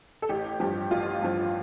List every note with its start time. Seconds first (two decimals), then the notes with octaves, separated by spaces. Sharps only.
0.22 A4
0.29 A1 G4
0.60 G2 F3 G4
0.91 A1 F4
1.22 G2 F3